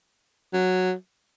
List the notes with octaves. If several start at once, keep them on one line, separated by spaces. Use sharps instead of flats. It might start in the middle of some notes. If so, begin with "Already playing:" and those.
F#3